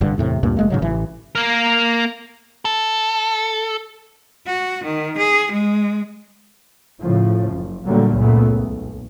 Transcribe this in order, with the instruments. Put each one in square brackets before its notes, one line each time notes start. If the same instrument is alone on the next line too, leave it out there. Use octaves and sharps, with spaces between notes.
[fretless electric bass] F1 G2 D3
E2 A2 C3
D2 G2 A#2
F1 G#3 A#3
G#2 C#3 F#3
A1 E3
[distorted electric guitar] A#3 A#4
[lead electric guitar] A4
[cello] F#4
D#3
G#4
G#3
[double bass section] A2 C#3 F3
F#1
A#2 D3 F#3 G3 A3 A#3
C#2 F#2 A#2 C#3 A3 B3
B1